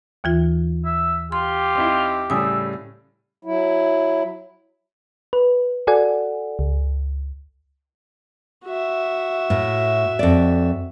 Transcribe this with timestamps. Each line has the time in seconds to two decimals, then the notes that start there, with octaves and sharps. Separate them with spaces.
0.24 D#2 E3 F4
0.85 E5
1.32 F4 G4 C6
1.75 C4 D#4 E4
2.30 A2 C#3 G3 E5 G#5 D#6
3.45 F#3 E4
5.33 B4
5.87 F#4 A4 D5 F#5 G#5
6.59 C#2
8.65 F#4 E5
9.50 A2
10.19 F2 D5